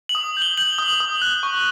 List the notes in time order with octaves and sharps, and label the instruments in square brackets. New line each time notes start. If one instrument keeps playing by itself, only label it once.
[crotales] F#7
D#6
G6
G7
G6 F#7
D#6
D#6
F#6
C#6